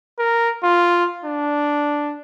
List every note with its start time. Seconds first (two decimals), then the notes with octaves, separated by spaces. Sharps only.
0.19 A#4
0.63 F4
1.24 D4